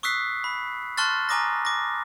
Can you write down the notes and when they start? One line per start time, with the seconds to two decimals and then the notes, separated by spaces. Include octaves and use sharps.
0.03 C#6 D#6 E6 F#6 B6 C7
0.44 B5
0.97 A5 C6 C#6 F6 F#6 A6
1.29 G#5 A#5 D6 D#6 A#6
1.65 D6 A#6